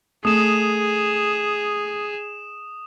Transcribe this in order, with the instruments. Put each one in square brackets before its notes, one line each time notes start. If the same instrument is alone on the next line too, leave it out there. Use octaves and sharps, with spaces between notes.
[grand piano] A3 [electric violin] G#4 [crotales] D#6 E7